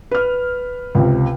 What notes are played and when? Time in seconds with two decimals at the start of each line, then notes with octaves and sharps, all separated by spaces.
0.11 B4 F6
0.95 C#2 C3